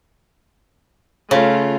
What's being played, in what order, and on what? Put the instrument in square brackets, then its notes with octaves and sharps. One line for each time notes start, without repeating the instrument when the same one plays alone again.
[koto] C#3 [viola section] A3 F4